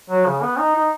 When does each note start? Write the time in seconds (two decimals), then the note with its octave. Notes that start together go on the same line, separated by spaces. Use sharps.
0.10 F#3
0.26 C#3
0.42 B3
0.58 D#4
0.75 D#4